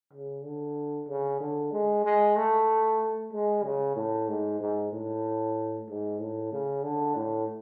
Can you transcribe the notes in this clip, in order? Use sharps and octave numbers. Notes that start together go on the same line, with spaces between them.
C#3
D3
C#3
D3
G#3
G#3
A3
G#3
C#3
A2
G#2
G#2
A2
G#2
A2
C#3
D3
A2